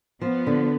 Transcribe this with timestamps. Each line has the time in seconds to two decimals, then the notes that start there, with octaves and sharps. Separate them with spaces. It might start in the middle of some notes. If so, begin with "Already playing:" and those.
0.21 F3 B3
0.47 D3